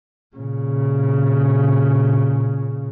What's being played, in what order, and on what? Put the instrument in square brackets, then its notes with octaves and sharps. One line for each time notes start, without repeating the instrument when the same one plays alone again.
[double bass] A#2 C#3